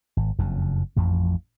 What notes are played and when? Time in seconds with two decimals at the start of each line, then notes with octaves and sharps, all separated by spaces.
0.17 G#1
0.39 F#1 F2 C#3
0.96 A1 F2 F3